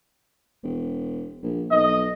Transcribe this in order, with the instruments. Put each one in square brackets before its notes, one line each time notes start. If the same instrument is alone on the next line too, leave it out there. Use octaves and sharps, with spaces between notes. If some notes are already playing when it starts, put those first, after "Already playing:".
[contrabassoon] E1
A#1
[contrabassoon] B1 [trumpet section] D#5